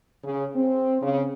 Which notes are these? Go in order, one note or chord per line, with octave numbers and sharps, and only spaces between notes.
C#3
C4
C#3